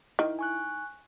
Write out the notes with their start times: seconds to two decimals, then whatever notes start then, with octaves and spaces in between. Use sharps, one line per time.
0.19 D#3 E4
0.39 G#5 C#6 F#6